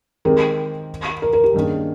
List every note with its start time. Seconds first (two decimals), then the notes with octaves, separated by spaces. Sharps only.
0.25 D#3 G#3 C4 G4 A#4
1.22 A#4
1.33 A#4
1.44 G4
1.54 G2 D#3 A#3 C#4 G#4